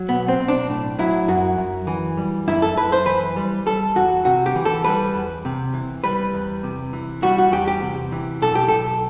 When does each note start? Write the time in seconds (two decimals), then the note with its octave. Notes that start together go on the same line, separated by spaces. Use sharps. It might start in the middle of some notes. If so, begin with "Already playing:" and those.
Already playing: F#3
0.09 B1 B3
0.28 C4
0.39 B1
0.48 D4
0.69 A2
0.99 F#3 E4
1.28 F#2 F#4
1.58 F#2
1.87 E3
2.17 G3
2.48 F#2 E4
2.62 A4
2.77 F#2 B4
2.92 C5
3.06 E3 B4
3.36 G3
3.66 G3 A4
3.96 E2 F#4
4.25 C3 F#4
4.46 G4
4.56 E3
4.65 A4
4.84 G3 B4
5.15 E2
5.45 C3
5.74 E3
6.04 G3 B4
6.34 E2
6.63 C3
6.93 E3
7.22 G3 F#4
7.38 F#4
7.52 E2 G4
7.68 G4
7.82 C3
8.12 E3
8.42 B1 A4
8.55 G4
8.68 B1 A4